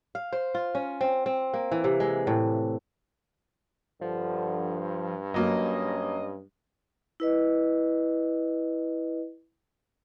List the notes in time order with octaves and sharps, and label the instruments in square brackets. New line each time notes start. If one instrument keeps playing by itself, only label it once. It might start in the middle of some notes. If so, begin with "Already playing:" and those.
[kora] F5
C5
F4
C#4
C4
C4
A#3
E3
C3
G#3
A2
[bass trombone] G2 [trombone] D3 [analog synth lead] F3
[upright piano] F#3 A#3 [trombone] C#4 [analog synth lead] D#5
[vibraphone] E4 B4 D#5